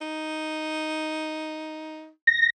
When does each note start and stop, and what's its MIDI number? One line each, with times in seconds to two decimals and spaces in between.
0.01 2.10 63
2.27 2.50 94